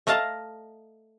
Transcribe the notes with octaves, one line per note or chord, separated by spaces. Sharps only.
A3 D#5 F5 A5 A#5